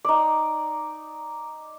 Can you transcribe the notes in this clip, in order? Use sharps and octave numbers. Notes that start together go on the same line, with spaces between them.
D#4 D5